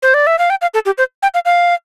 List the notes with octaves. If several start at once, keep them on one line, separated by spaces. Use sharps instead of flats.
C5
D5
E5
F5
G5
F5
A4
G4
C5
G5
F5
F5